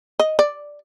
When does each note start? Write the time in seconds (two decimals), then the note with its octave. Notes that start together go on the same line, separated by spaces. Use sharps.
0.19 D#5
0.39 D5